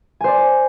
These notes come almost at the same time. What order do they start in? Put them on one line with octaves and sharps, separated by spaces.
G#5 C5 D5